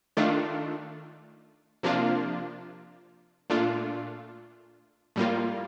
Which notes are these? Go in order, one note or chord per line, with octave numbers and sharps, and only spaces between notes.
D#3 A3 D4 F4
C3 F3 A#3 D4 F4
A#2 A3 D4 F4
A2 G3 A#3 F4